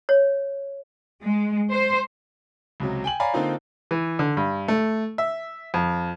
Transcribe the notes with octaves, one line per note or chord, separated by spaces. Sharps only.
C#5
G#3
C5
C#2 C3 F#3
G5 G#5 F#7
C#5 D5 F5 G#5 A#5 B5
D3 A#3 C4 D#4 F4 C5
E3
D3
G2
A3
E5
F2